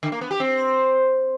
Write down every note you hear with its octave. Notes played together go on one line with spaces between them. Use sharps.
D3
A#3
B3
G4
C4